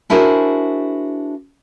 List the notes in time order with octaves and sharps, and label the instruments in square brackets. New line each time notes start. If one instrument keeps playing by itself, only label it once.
[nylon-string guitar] D4 E4 F#4 G#4 A#4 C5